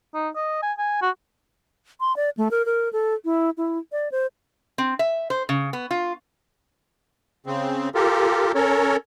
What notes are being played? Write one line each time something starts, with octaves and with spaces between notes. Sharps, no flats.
D#4
D#5
G#5
G#5
F#4
C6
D5
A3
A#4
A#4
A4
E4
E4
D5
C5
C4
E5
C5
C#3
B3
F4
C#3 C4
F4 G4 A4 A#4
C#4 A4 A#4 C#5